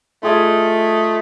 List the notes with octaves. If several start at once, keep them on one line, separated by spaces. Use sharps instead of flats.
A3 F4 G#4 D#5